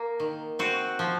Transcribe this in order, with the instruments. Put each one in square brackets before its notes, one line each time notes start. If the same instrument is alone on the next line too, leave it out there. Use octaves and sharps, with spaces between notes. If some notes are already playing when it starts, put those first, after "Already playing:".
Already playing: [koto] A#3
D#3
C4 F#4
F3